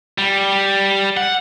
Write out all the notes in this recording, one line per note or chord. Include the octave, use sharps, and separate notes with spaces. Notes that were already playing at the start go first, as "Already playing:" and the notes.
G3
F#5